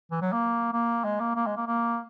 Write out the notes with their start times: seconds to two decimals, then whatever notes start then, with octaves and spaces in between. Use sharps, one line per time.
0.12 E3
0.22 F#3
0.33 A#3
0.73 A#3
1.05 G#3
1.20 A#3
1.36 A#3
1.47 G#3
1.57 A#3
1.67 A#3